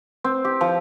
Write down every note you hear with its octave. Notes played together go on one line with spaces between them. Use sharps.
C4
G4
F3